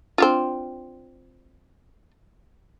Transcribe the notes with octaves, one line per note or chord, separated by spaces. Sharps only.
C4 D4 F4